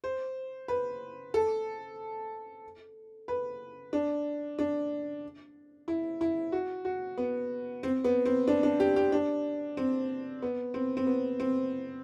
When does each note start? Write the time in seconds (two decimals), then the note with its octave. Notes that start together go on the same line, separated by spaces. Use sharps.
0.04 C5
0.68 B4
1.34 A4
3.28 B4
3.93 D4
4.59 D4
5.88 E4
6.21 E4
6.52 F#4
6.85 F#4
7.18 B3
7.83 C4
8.04 B3
8.25 C4
8.48 D4
8.63 D4
8.80 G4
8.96 G4
9.12 D4
9.77 C4
10.42 B3
10.74 C4
10.97 C4
11.07 B3
11.40 C4